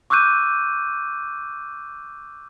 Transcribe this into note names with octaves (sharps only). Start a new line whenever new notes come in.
C#6 D6 E6 F#6 G6 D#7